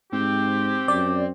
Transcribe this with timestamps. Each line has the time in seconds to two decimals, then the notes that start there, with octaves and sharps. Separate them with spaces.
0.13 G#2 C4 G4
0.88 F#2 D5